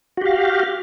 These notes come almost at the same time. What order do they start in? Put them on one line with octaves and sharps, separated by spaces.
F#4 G4 F5